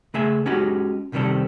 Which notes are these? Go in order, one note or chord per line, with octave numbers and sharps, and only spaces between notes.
C#3 A3 G#4 E5 G#5
G#3 C#4 D#4 F#4 G4
C2 C3 D#3 G3 C4 A4